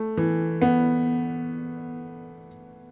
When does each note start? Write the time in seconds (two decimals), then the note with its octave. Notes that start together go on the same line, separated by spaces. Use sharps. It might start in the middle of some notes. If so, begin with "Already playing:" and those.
Already playing: A3
0.17 E3
0.61 B3